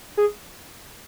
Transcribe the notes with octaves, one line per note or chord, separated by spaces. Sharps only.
G#4